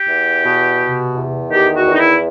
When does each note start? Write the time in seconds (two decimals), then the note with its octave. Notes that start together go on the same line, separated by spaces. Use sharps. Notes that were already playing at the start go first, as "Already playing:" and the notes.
Already playing: G4
0.08 E2
0.44 B2
0.79 C3
1.15 E2
1.50 D#3 G4
1.75 F#4
1.86 E2
1.93 D#4
1.98 E4